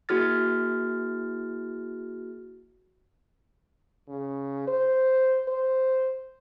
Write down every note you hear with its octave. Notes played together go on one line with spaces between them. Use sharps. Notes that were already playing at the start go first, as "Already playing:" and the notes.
A#3 E4 F#4 G#4 F6 A6
C#3
C5
C5